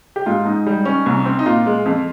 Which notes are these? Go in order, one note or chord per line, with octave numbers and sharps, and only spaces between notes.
G4
G#2 F4
G#2 D#4
G3
C#4
C2
C4
D#4
A#2 F4
G#3
F2